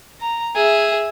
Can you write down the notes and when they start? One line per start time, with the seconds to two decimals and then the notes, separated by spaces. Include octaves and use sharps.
0.20 A#5
0.55 G#4 E5